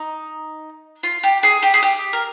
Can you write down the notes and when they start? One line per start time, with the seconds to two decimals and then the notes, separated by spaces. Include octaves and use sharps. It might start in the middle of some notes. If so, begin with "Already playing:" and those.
Already playing: D#4
1.03 F4
1.23 G4
1.43 G#4
1.63 G4
1.74 G#4
1.83 G4
2.13 A#4